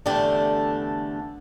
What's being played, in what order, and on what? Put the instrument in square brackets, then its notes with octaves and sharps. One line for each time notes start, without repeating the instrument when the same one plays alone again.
[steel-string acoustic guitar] E2 D3 A3 D4 G4